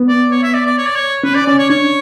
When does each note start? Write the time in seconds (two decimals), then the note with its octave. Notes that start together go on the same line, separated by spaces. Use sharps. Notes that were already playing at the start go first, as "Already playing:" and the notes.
Already playing: B3
0.08 D5
0.31 C#5
0.43 E5
0.54 D5
0.66 D5
0.78 C#5
0.86 D5
0.96 C#5
1.24 C#4 B4
1.35 D5
1.46 C#4 D5
1.58 C#5
1.70 D4 C#5